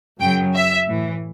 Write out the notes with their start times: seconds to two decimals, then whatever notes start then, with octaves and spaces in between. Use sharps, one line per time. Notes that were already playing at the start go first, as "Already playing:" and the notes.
0.20 F#2 C#3 F#3 G5
0.54 E5
0.86 A2 E3